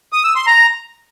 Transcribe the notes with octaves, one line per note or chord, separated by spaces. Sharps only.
D#6
E6
C6
A#5